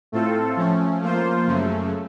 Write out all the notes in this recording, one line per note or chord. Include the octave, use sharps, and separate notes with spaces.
A2 A3 C4 F4 A4
F3 A3 C#4
F3 A#3 F4 C5
F#2 C#3 A3